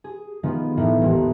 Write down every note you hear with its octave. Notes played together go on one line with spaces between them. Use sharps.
G#4
D#3 F3 G#3 B3
A2 D#3 E3
A1 D#2 A#2 E3 G#3